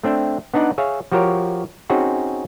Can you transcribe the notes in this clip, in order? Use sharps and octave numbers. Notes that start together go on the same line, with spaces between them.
A3 C4 D4 E5 G5
B3 D4 D#4 D5 D#5 F#5
G#4 C#5 E5 F5
F3 F#4 G4 A#4 C#5
C4 C#4 D#4 F#4 G#4